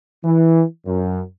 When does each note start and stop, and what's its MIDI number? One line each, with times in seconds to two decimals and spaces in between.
0.24 0.63 52
0.86 1.21 42